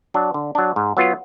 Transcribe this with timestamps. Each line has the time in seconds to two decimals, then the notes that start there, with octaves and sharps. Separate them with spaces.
0.14 F#3 D4
0.34 D3
0.55 F#3 D4
0.76 G#2
0.97 F#3 B3 F4